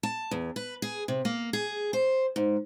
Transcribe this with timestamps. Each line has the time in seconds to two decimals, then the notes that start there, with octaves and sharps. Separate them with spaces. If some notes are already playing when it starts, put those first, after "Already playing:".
0.03 A5
0.31 E2
0.56 B4
0.82 G#4
1.08 C3
1.25 A#3
1.53 G#4
1.93 C5
2.36 G#2